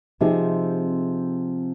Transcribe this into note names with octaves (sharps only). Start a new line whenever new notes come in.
C3 F3 C4 D#4 G#4